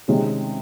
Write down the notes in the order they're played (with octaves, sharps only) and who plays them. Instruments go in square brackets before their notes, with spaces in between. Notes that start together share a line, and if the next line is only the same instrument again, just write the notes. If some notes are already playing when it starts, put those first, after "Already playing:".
[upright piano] C3 D#3 G#3 C#4